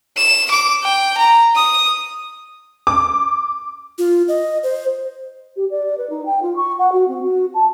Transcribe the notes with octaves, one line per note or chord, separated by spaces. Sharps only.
E7
D6
G5
A#5
D#6
D6
F4
D#5
C5
G4
D5
B4
D#4
G5
F4
C#6
F#5
F#4
C4
F#4
A5